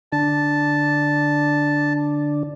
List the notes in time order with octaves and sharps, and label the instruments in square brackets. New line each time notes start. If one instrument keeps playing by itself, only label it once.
[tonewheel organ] D3 D4 [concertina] A5